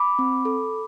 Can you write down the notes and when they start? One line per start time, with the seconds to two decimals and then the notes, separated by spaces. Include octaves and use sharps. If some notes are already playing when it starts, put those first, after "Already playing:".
Already playing: B5 D6
0.19 C4
0.45 A4